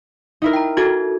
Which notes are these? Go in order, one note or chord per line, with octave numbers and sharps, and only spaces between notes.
D#4 E4 A#4
G5 A#5
E4 F#4 A4 G#6